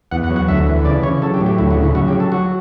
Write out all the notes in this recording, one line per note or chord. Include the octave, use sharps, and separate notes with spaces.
E2 F#5
F#5
F#3
F#5
D2 E5
E3
C#3 D5
C#3 C#5
F#3 A4
G4
A2
G4
D2 E4
F#4
C#3
E4
F#3 F#4
G4
F#3
A4
F#3 F#4